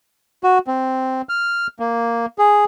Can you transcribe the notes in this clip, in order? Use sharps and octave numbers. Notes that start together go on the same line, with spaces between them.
F#4
C4
F6
A#3
G#4